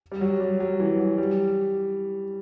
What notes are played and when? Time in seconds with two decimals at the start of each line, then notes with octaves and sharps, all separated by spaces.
0.12 G3
0.21 F#3
0.40 G3
0.60 F#3
0.80 E3
1.00 F#3
1.18 G3